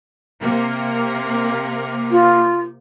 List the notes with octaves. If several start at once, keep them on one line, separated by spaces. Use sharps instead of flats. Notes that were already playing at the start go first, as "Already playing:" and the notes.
C3 A#3
F4